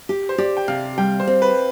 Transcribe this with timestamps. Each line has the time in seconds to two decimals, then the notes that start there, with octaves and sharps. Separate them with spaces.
0.09 G4
0.29 C5
0.38 G4 D5
0.57 G5
0.68 C3 F5
0.98 G3 G5
1.20 C5
1.27 C4
1.42 B4